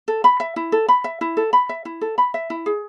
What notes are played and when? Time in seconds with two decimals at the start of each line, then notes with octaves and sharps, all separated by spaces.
0.08 A4
0.24 B5
0.40 E5
0.56 E4
0.72 A4
0.88 B5
1.04 E5
1.21 E4
1.37 A4
1.53 B5
1.69 E5
1.85 E4
2.01 A4
2.18 B5
2.34 E5
2.50 E4
2.66 G#4